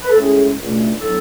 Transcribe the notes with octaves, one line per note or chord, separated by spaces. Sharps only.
B4
A4
A2 G#3 C#4 G#4
C#2 B2 A3 D4
A2 F#3 B3 D4 A4